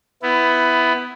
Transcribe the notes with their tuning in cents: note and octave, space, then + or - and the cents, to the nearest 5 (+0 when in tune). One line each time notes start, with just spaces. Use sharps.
B3 +15 E4 +0